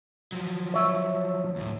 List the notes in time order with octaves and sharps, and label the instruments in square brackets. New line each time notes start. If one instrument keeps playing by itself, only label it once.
[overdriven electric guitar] F3 F#3
[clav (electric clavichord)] C#5 E5
[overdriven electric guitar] D2 A2